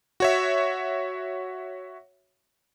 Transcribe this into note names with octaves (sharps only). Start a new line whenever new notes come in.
F#4 C#5 E5